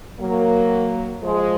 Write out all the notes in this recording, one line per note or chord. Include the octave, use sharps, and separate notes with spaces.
F#3 A#3
F3 G#3